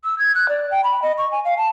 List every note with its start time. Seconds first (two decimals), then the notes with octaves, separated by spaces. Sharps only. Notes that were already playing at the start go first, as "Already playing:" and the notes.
0.04 E6
0.19 G#6
0.35 F#6
0.49 D5
0.71 G5
0.84 B5
1.02 D#5
1.18 C#6
1.32 G#5
1.45 F5
1.57 A5